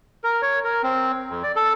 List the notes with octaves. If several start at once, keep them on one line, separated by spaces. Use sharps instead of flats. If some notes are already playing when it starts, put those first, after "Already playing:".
A#4
C#5
A#4
C4
F2
D5
A4